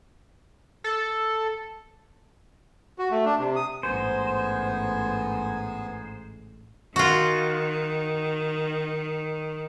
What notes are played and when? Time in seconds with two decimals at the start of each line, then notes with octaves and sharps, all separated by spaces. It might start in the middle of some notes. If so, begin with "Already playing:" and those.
0.84 A4
2.98 F#4
3.11 A3
3.25 D4
3.39 C3
3.56 D#6
3.83 A1 G#2 B3 C5 G#5
6.96 D#3 F4 F#4